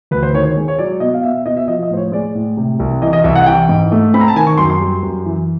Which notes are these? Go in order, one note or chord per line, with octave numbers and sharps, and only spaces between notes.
D2 B4
C5
D#3 C#5
C#5
G#3
C#5
F#3 D5
B2 D#5
F5
B3 E5
E5
B2 D#5
E5
F3 D#5
D#5
A2 C5
C#5
G#3 D5
A2
C3
C2
E3 D#5
D#5
C2 E5
F#5
E3 G5
G#2
A3
C4 B5
A#5
A5
D#3 G#5
C#6
F#2 C6
C6
G3
F#2
E3